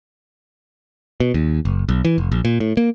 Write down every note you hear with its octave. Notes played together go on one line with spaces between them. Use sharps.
B2
D#2
F#1
B1
E3
F1
A#1
A#2
A2
A#3